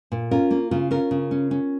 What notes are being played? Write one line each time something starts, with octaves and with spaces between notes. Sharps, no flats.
A#2
C#4 F4 A#4
A#3
C#3 F4
C#4 F4 A#4
C#3
C#4
C#4